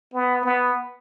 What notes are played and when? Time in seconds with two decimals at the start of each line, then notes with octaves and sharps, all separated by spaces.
0.13 B3
0.44 B3